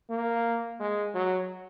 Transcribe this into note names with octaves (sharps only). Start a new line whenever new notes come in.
A#3
G#3
F#3